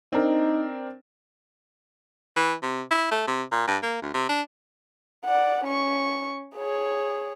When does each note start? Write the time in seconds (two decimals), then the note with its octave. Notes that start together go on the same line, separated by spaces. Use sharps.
0.13 C4 D4 D#4 A#4
2.36 E3
2.63 C3
2.91 E4
3.11 A3
3.27 C3
3.52 A#2
3.67 G2
3.83 A#3
4.02 D2
4.14 C3
4.29 D4
5.25 D5 F#5
5.64 C#4 C#6
6.56 G#4 C#5